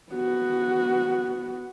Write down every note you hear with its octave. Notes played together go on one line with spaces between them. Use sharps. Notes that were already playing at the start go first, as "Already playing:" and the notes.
B3 F#4